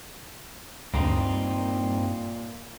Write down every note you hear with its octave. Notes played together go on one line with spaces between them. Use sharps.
D2 G2 A#2 A#3 C4 D#4